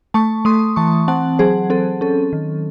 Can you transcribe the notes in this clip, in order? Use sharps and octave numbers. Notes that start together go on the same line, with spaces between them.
A3 A5 C#6
A3 C6 D#6
E3 A5 C#6
C4 F#5 A5
F#3 G#4 C5
C4 A4
C#4 A4
D#3